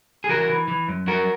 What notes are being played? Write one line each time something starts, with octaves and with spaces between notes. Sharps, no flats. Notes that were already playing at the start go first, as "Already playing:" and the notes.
G#4
E3 F#4 A#4
E3
E3
F#2
F#2 F#4 A#4